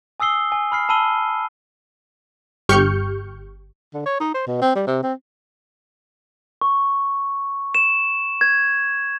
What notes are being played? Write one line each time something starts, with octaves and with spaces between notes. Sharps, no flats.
G#5 D#6 E6 C7 G7
G#5
B5 F6 C7
A5 B5 E6 D#7 G7
G1 G4 C#6 F6 G6 C#7
D3
C#5
D#4
C5
B2
C4
G3
C3
C4
C#6
E7
G#6